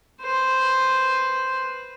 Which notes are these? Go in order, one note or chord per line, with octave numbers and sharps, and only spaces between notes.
B4 C5